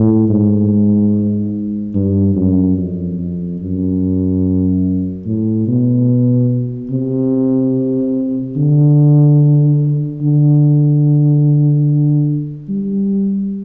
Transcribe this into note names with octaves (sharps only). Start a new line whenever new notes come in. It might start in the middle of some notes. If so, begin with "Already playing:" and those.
Already playing: A2
G#2
G2
F#2
F2
F2
F#2
A2
B2
C3
D3
D3
G3